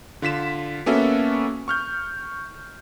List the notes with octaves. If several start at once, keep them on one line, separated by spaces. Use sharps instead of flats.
D3 F4 B6 E7
A#3 B3 C#4 F#4 A4 E5
C#6 F6 G6